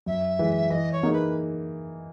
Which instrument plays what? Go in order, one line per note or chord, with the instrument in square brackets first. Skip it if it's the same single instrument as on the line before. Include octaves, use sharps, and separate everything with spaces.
[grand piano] F#2 [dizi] E5
[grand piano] E3 G#3
[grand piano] E3 [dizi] D#5
[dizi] C#5
[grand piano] A#3 D#4 G#4
[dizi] B4